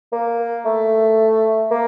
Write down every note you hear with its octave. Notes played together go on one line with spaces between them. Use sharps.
A#3
A3
A#3